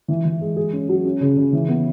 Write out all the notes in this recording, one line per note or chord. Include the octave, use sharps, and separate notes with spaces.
E3
E3
G#3
G#4
C#4
F#3
C#4
C#3
C#3
E3
B3